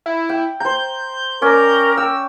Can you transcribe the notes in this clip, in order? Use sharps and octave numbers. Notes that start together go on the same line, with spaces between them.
E4
G5
C5 A#5 G6
C#4 A#4 D5
G5 E6